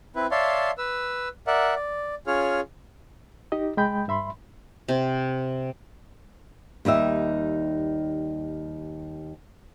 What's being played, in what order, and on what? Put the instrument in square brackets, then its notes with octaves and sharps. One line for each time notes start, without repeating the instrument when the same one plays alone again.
[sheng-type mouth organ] C4 E4 B4
C#5 D5 E5 F5 A5 C6
B4 E6
A#4 D5 E5 F#5
D5
C#4 F4 G#4 C#5 F6
[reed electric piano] D#4 G4 D#5
C2 G#3 D#5 G5 B5 G6
G2 E5 B5 C6
[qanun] C3
[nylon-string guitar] D#2 G3 D#4 E5